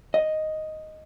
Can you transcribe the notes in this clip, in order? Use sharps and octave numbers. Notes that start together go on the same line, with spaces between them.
D#5